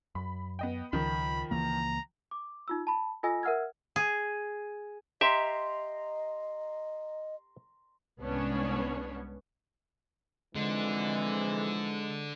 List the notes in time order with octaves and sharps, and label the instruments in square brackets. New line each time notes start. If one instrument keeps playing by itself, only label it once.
[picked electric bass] F#2 [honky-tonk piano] B5
[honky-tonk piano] B3 D#5 G5
[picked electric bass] C#2 [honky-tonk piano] D#3 F3 [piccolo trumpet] B5
[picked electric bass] C#2 E3 A#3 [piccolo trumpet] A#5
[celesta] D6
D#4 F4 E6
A5 B5
F4 A4 D#5 G#5 E6 A#6
A#4 E5 F#5 E6 F6 G#6
[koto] G#4
[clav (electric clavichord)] G4 E5 [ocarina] D#5 [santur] A#5 C6
[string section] C2 G#2 B3 C#4 D4 C#5
[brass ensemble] F2 G#2 E3 [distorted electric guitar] D3 [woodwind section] G#3